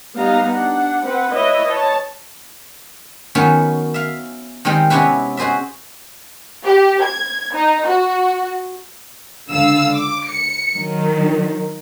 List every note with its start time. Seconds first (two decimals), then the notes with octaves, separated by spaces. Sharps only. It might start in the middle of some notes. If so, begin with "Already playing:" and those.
0.16 G3 B3 D#4 F5 A#5
0.52 D4 F#5
1.03 C4 B4 F#5
1.33 E4 B4 C#5 D#5 E5
1.66 C#5 A5
3.35 D#3 F#3 B3 C#4
3.94 E5 F5
4.65 D#3 G3 G#3 C4
4.90 C3 B3 C#4 E4 B4
5.37 F#4 G#4 C5 D#5 E5
6.65 G4
7.03 G#6
7.54 D#4
7.87 F#4
9.51 C#2 D3 F5 E6
9.95 D6
10.28 C#7
10.74 D#3 F#3